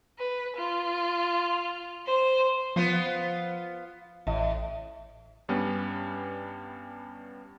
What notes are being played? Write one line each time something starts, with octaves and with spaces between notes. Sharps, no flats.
B4
F4
C5
F3 B3 F4 C5
A1 A2 D#5
G2 G3 B3 C#4